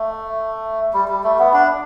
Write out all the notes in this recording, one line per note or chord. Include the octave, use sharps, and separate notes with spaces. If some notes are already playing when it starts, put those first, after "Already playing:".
Already playing: A3
G3
G3
A3
B3
D4